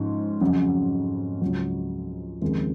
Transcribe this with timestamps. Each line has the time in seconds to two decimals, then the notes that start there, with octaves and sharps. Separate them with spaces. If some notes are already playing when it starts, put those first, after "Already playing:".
Already playing: G#2 F3 C#4
0.41 F2 C#3 F#3 C#4
1.41 C#2 C#3 F#3
2.41 D#2 C#3 F3 G#3 C4